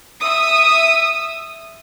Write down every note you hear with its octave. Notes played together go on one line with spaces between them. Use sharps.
E5 D#6 E6